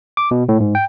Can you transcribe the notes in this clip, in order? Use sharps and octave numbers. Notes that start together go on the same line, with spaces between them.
D6
B2
A2
G#2
G5